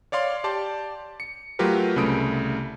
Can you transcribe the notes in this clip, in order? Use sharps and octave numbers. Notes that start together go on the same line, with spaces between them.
C#5 D5 F5 C6 D6
G4 D5 A5 C6
C#7
F#3 A3 F4 G4 A#4 B4
C2 C#3 A3 B5 D#6 D7